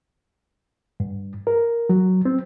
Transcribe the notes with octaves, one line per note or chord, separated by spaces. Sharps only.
G2
A#4
F#3
C4